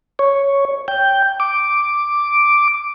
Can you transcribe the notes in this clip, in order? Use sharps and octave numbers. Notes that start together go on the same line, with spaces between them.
C#5
G5
D6